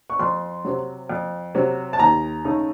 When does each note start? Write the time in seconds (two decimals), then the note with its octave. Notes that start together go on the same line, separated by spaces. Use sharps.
0.10 C#6
0.19 F2 C6
0.65 C3 F#3
1.09 F2
1.55 C3 F#3
1.93 A5
1.99 D#2 A#5
2.45 C#3 A3 D#4